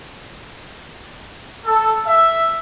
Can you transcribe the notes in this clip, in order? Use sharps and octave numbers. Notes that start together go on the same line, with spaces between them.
A4
E5